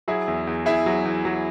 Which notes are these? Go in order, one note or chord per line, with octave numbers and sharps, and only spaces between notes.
F#3 E4 G#4
E2
E2
E2 E4 G#4
F#3
E2
F#3